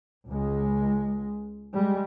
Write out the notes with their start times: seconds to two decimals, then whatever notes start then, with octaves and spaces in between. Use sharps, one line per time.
0.29 C#2 G#3
1.73 G3 G#3